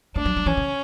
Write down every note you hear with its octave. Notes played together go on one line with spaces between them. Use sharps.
A3 D4
F#3
F#3
E3 C#4
C#3